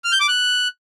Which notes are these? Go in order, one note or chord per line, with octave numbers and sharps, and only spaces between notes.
F6
G6
D6
F#6